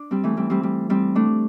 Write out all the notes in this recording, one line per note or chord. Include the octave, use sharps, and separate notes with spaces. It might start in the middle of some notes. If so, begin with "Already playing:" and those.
Already playing: D4
G3 C4
E3 A3
G3 C4
G3 C4
G3
G3 C4
A3 D4